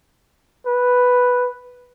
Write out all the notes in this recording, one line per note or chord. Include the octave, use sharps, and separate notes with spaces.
B4